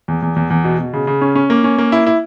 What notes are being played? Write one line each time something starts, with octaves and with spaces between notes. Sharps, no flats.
E2
E2
E2
E2
B2
B2
C#3
C#3
C#4
C#4
A#3
C#4
A#3
E4
E4